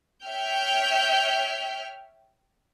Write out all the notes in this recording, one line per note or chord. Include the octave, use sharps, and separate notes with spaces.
C#5 E5 G5 F6 G6